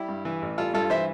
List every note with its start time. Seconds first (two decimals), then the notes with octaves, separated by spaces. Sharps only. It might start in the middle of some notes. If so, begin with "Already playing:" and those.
Already playing: G3 E4 G4
0.08 G2
0.25 E3
0.42 A1
0.58 G3 F4 A4
0.74 G2 F4 A4
0.90 E3 C5 E5